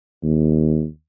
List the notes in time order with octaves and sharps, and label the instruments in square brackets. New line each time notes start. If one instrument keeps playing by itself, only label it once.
[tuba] D#2